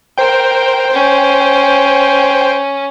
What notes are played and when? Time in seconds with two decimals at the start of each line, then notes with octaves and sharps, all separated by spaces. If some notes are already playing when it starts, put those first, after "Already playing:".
0.18 A#4 C5 G5
0.93 C#4